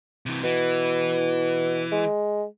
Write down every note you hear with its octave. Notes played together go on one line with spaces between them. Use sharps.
C3 E3
B2 E3
G#3